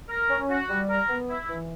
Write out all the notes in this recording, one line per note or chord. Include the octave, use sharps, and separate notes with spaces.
A#4
C#4
F#4
G3
A#4
B3
E4
E3